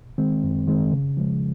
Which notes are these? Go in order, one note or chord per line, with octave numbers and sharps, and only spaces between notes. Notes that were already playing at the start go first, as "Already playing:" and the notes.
D#3 G#3 C4
F#2
D#3 G#3 C4
C#3
F3 G#3